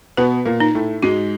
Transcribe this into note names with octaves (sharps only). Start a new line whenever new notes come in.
B2 B3 B4
A#2 A#3
D#4
A2 A3
G#2 G#3 F#4